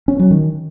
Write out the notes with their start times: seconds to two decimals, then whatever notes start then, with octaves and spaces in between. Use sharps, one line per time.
0.08 C#4
0.19 F#3
0.31 D#3